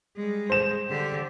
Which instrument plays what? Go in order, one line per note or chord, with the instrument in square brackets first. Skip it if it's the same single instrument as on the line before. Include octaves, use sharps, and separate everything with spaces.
[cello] G3 G#3
[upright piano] C5 E7
[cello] D3 G4